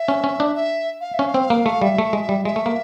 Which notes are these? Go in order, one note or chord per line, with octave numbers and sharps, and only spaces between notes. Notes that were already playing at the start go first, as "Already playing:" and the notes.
Already playing: E5
C#4
C#4
D4
E5
F5
E5
C#4
F5
C4
A#3
A3
G3 E5
A3
G#3
G3
G#3 E5
A3
A#3